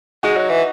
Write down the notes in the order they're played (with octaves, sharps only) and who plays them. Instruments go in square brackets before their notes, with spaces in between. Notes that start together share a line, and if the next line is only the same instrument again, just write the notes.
[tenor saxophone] G#3 [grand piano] D#4 F#4
[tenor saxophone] F#3
E3